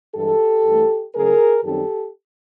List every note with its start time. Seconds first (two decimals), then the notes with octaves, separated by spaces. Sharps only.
0.15 G2 E3 G#3 G4 A4
0.65 G2 E3 A3
1.15 C#3 F#3 A3 G#4 A#4
1.64 F#2 D#3 G3 C4 D#4 G4 A4